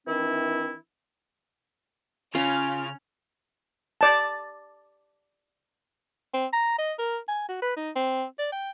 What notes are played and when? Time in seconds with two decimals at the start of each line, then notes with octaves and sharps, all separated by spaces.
0.06 D#3 E3 C4 D4 E4
2.35 C#3 C#4 F4 F6
4.01 D5 A5
6.34 C4
6.53 A#5
6.79 D#5
6.99 A#4
7.29 G#5
7.49 F#4
7.62 B4
7.77 D#4
7.96 C4
8.39 D5
8.52 G5